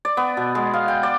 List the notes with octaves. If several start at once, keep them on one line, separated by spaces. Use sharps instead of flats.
D5
B3
B2
G#3
F5
G5
D5